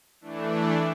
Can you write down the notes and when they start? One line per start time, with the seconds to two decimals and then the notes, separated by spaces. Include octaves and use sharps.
0.21 E3 A3 D4